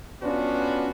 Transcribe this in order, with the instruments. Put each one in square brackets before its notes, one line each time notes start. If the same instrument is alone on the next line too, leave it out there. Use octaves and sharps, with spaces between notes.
[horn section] B3 C#4 D4 F4 F#4 B4